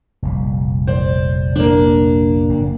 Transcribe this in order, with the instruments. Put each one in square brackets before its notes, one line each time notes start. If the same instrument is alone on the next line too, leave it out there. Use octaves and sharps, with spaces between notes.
[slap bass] F1 A#1 G3
[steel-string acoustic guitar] C5 D5
A#3 D4
[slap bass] F#1 A2